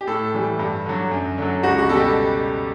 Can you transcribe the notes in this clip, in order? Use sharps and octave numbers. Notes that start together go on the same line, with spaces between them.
G4
A2 A4
E3 G3
G2
D3 F#3
F#2
D3 F#3
C#2 F#4
F#4
B2 G3 A4
G4